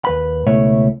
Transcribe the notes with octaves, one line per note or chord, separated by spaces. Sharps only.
D#2 B4 B5
C#2 B2 A3 E4 C#5